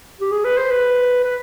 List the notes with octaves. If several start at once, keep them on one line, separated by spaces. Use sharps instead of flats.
G4
G#4
B4
C5
B4
B4